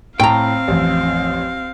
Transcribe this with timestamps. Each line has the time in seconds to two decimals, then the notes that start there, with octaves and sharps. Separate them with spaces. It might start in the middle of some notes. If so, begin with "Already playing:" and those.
0.20 A2 C4 F5 G5 A5 A#5
0.68 A1 F2